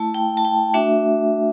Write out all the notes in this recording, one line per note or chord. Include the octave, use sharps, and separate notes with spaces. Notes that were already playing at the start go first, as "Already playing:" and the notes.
Already playing: A3 E4 A5
G5
A5
G5
A3 D4 F#4 E5